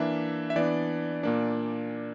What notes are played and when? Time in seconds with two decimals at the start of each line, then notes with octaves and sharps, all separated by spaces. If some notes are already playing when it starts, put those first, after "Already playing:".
Already playing: E3 A#3 D4 E5
0.50 E5
0.56 E3 B3 D4 D5
1.23 A#2 A#3 D4 D5